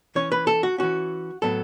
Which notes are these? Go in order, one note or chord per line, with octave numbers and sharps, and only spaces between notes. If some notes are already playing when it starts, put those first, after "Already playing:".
E3 C#4 C#5
B4
A4
F#4
E3 C#4 F#4
A2 F#3 B3 A4